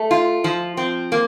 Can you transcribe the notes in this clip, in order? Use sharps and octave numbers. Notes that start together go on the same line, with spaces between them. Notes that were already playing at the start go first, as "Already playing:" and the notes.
Already playing: A3
F4
F3
C4
A#3